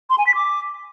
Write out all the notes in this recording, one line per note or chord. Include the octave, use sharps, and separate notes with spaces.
C6
G#5
B6
D6